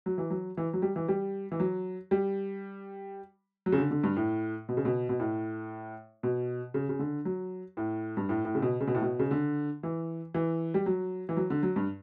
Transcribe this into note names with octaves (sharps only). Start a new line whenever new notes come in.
F#3
E3
F#3
E3
F#3
G3
E3
G3
E3
F#3
G3
F#3
C#3
D3
D3
G2
A2
B2
C#3
B2
B2
A2
B2
C#3
C#3
D3
F#3
A2
G2
A2
A2
C#3
B2
C#3
B2
A2
B2
C#3
D3
E3
E3
G3
F#3
E3
F#3
D3
F#3
G2